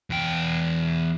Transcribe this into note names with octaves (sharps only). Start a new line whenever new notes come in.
E2 G5